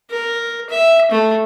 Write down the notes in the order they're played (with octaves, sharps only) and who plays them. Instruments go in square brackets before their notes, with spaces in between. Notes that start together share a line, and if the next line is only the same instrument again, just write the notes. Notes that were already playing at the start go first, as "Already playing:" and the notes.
[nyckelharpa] A#4
E5
A3